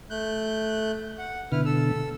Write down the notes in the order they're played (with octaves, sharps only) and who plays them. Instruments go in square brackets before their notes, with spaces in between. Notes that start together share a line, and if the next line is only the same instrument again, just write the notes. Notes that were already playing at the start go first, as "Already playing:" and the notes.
[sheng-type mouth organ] A3 F#6 G6
F#5
[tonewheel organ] B2 D3 [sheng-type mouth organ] E4 B4 F6
[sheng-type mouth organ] A4 E6